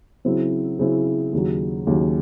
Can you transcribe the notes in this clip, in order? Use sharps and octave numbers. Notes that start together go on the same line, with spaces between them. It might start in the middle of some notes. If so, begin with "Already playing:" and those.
C#3 F#3 C4 E4
C#3 F#3 C4 E4
D#2 C#3 F#3
D#2 C#3 F#3